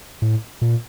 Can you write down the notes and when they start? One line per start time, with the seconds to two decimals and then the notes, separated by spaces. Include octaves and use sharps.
0.22 A2
0.62 A#2